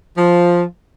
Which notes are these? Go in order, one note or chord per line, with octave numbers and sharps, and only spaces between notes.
F3